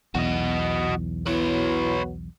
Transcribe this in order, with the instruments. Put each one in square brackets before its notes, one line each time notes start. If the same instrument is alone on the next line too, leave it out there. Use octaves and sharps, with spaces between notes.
[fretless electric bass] B1 E2 [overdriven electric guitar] F#4 D#5
[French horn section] F#3 B3 [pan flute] E4 [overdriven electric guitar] B4 C#5